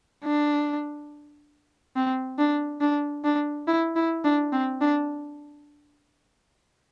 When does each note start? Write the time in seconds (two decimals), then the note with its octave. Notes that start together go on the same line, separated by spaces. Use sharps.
0.24 D4
1.96 C4
2.38 D4
2.81 D4
3.24 D4
3.68 E4
3.96 E4
4.25 D4
4.53 C4
4.81 D4